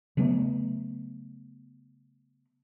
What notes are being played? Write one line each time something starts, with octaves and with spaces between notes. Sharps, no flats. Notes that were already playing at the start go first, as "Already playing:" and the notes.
C#3 F#3 A3 B3